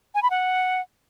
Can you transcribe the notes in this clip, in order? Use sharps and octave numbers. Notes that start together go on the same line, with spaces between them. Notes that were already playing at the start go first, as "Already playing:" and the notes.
G#5
B5
F#5